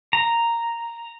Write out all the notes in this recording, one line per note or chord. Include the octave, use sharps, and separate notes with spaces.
A#5